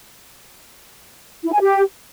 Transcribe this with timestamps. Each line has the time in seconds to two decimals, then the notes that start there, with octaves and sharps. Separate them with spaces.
1.45 E4
1.53 G#5
1.61 G4